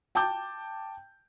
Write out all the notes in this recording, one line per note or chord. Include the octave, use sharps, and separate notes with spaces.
G5 A5 D6 G6